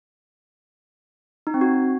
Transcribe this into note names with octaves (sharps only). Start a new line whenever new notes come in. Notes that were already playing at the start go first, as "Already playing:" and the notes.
D#4
C4
F#4